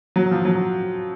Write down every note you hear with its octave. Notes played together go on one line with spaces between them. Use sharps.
F#3
F3
F#3